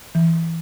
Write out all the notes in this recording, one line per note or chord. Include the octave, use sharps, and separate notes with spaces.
E3